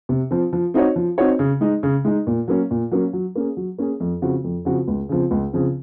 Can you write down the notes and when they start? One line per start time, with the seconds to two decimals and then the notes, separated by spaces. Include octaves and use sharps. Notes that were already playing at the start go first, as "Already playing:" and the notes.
0.09 C3
0.31 F3 C4
0.53 F3
0.74 C4 D#4 F#4 C#5
0.96 F3
1.18 C4 D#4 F#4 C#5
1.39 C#3
1.61 G#3 D#4
1.83 C#3
2.05 G#3 D#4
2.27 A#2
2.48 F#3 A#3 C#4
2.71 A#2
2.92 F#3 A#3 C#4
3.13 F#3
3.35 A#3 C#4 G#4
3.57 F#3
3.78 A#3 C#4 G#4
4.00 F2
4.22 C#3 F3 C4 F#4
4.44 F2
4.65 C#3 F3 C4 F#4
4.88 C#2
5.09 C#3 F3 C4
5.31 C#2
5.53 C#3 F3 C4